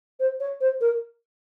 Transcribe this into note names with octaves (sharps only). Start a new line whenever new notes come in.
C5
C#5
C5
A#4